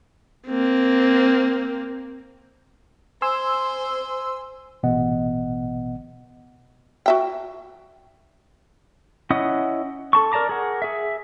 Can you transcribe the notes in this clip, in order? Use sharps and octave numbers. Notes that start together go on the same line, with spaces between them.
A#3 C4
C5 G#5 C6 E6
A1 B2 B3 D#5 F#5
F#4 E5 G5
C#4 E4 D#5 F#5 D#6
A4 A5 C#6
A#4 D5 A5 A#5 D6
G#4 A#4 F#5
G#4 E5